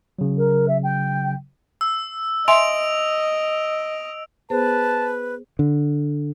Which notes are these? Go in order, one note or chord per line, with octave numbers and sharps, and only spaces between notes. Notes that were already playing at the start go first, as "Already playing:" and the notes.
C#3 F#3
A#4
E5
G5
E6
D#5 E5 G#5 C6 D7 F7
B3 G#4 B4 C5 A5
D3